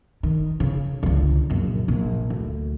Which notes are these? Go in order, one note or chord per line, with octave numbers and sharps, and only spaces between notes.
D#3
C#3
C#2 D3
A#1 F#2
A#1
D2